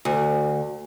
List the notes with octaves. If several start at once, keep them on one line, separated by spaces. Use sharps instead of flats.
D2